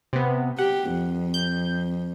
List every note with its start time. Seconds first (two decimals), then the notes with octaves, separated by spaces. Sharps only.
0.13 C3 B3
0.58 G4 F#5
0.92 F2
1.34 G6